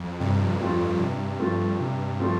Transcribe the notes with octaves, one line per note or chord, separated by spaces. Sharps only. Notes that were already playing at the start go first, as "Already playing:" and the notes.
Already playing: F2
G2 C3
F3 A3 C4 F4
G2 C3
F3 A3 C4 F4
C3
F3 A3 C4 F4